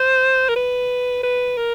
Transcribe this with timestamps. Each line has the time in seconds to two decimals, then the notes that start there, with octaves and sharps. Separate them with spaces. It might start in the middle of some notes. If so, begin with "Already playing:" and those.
Already playing: C5
0.49 A#4
0.56 B4
1.23 B4
1.57 A#4